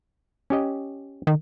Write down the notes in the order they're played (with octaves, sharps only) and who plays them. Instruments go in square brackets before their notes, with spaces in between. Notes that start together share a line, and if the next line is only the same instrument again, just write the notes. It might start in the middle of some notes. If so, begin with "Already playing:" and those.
[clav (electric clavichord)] C#4 G4 D#5
[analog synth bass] D#3